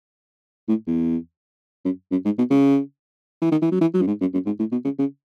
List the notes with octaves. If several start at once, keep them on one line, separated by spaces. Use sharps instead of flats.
A2
E2
F#2
F#2
G#2
B2
C#3
E3
D#3
E3
F#3
E3
F#3
F#2
G#2
F#2
F#2
G#2
A2
B2
C#3
C#3